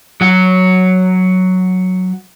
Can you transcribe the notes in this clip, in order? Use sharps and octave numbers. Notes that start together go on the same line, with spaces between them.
F#3 F#4